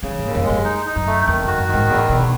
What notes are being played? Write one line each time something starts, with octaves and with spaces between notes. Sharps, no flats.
C#3 E3
G#2
D#2
F#2
G#3
F#2
D#4
D#4
F#2
A3
E2 D#3
F#2 F#4
F#2
D#3
G#2
E2 A2
E2 B2